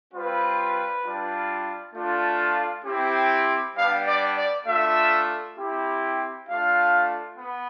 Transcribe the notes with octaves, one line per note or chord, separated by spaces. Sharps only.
G3 C4 F4 B4
G3 D4 F4
A3 D4 F4
C4 E4 G4
G3 B3 D4 F5
D5
D5
A3 D4 F4 E5
C4 E4 G4
A3 D4 F4 F5
B3